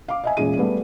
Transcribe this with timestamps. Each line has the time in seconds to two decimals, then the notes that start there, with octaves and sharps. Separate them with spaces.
0.08 F5 D6
0.24 D#5 E5 G#5
0.37 E1 A#2 C#4 G#4 D#7
0.57 G3 A3 B3 A4